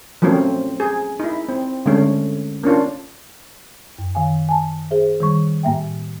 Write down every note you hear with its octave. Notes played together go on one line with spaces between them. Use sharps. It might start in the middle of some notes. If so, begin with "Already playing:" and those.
F3 F#3 A3 C4 C#4
G#4
D#4 E4
C4
D3 G#3 A3 C#4
A#3 C#4 D4 F4
F#2
D#3 F5 G#5
G#5 A5
G#4 C5 E5
D#3 G3 C#6
A2 A#3 E5 G5